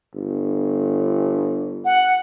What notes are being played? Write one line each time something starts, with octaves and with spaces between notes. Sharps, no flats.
G1
F#5